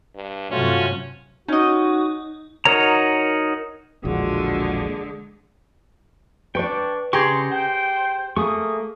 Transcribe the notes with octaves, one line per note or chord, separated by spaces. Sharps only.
G2
G2 C3 F#3 A3 C#4 F4 F#4
C#4 D#4 F#4 D#5
D#4 F#4 A#4 C#5 A#5
E1 A#1 D3 G#3 F4 F#4 G#4
D4 B4 D5 G5 C#6
C#3 G4 G#4 A#5 C6 C#6
C5 G5
A3 A#3 G#4 C#6 D#6